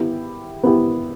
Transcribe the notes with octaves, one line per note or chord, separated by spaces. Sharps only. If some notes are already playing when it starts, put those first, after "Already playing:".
Already playing: B3 E4 G4
B3 E4 G4